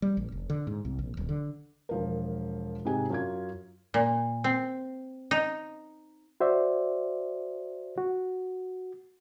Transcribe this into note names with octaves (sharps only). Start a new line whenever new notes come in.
G3
A1
F1
D3
G#2
C2
A#1
D1
D3
E1 F3 A#4
G#2 C3 G#3 G#5
F#2 F4 G#6
A#2
C4
D#4
F#4 C5 D5 E5
F#4